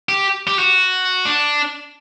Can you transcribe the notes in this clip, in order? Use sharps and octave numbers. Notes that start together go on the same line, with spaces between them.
G4
G4
F#4
D4